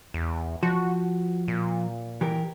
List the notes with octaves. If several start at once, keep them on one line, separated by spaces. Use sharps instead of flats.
E2
F3 F#4
A#2
E3 G4 A#4